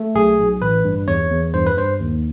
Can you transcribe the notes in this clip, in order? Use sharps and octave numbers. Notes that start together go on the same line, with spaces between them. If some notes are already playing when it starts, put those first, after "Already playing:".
Already playing: A3
B1 G#4
B1
A1 B4
G2
E2 C#5
E2
G2 C5
B4
G2 C5
D#2